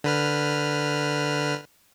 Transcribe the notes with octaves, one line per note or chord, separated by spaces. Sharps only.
D3 B4 F6